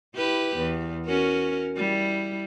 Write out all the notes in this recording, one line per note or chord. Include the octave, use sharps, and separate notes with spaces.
E4 G4 B4
E2
C#4 F#4 A#4
G3 E4